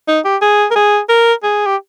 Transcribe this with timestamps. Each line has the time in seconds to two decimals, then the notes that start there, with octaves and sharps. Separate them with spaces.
0.08 D#4
0.25 G4
0.42 G#4
0.71 A#4
0.76 G#4
1.09 A#4
1.43 G#4
1.66 G4